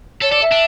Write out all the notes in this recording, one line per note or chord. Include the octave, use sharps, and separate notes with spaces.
A4 C#5
A4 D5
E5
D4